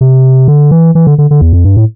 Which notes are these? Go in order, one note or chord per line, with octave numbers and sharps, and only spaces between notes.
C3
D3
E3
E3
D3
D3
D3
E2
F2
G2
A2